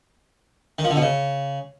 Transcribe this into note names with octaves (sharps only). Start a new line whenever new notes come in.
D#3
F3
D3
B2
C#3